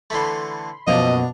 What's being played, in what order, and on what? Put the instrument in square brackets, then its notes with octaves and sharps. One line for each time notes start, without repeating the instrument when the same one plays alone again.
[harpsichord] D3 E3 A3 [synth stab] B5 C6
[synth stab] F#2 F3 A#3 [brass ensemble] B2 [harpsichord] D4 A#5 [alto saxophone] D#5